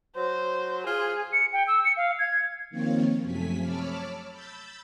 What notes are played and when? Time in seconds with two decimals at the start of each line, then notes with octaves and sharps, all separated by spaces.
0.16 F#3 C5
0.87 F4 G#4
1.33 C#7
1.53 G5
1.67 E6
1.85 C#7
1.97 F5
2.19 G#6
2.70 D#3 F3 A#3 C4 F4 C#5
3.22 F#2 C3 F3 A3 G#5 B6
3.62 C#5 A5 B5 D6 E6 F6
4.32 B5 E6 G6 A6